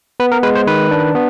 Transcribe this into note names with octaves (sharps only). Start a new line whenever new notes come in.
B3 B4
A#4
G#3 B4
C5
D#3 B4
D4
B3